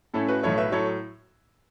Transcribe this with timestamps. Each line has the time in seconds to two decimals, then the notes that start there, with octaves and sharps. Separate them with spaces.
0.14 A2 A3 C#4 E4 A4
0.28 F#4 B4
0.43 B1 A2 A3 E4 A4 C#5
0.58 B4 E5
0.72 A2 F#3 A4 C#5